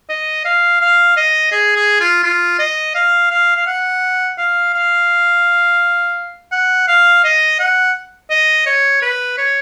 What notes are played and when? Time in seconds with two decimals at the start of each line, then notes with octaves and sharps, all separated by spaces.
0.09 D#5
0.45 F5
0.81 F5
1.17 D#5
1.52 G#4
1.76 G#4
2.00 F4
2.23 F4
2.59 D#5
2.95 F5
3.31 F5
3.56 F5
3.66 F#5
4.38 F5
4.74 F5
6.52 F#5
6.88 F5
7.24 D#5
7.59 F#5
8.30 D#5
8.66 C#5
9.02 B4
9.38 C#5